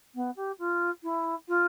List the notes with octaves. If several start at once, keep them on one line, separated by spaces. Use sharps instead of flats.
B3
G4
F4
E4
F4